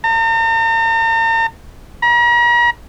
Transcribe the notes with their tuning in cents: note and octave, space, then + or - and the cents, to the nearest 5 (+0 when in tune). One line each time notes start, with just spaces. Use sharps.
A#5 -45
A#5 +40